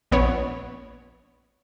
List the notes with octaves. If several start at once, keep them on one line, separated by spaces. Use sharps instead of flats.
A#1 B3 C#5